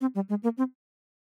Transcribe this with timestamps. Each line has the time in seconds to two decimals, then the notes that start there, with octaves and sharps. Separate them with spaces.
0.01 C4
0.15 G3
0.29 G#3
0.43 A#3
0.58 C4